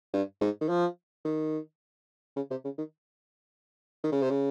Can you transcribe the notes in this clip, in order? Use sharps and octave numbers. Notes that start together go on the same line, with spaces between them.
G2
G#2
D#3
F3
D#3
C#3
C3
C#3
D#3
D#3
C#3
C3
C#3